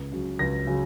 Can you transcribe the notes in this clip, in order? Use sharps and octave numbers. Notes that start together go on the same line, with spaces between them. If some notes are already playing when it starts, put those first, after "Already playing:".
Already playing: C#2
C#3 F#3
C#2 A#6
C#3 F#3